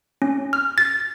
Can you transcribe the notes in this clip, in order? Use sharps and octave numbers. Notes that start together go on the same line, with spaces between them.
C#4
F6
A6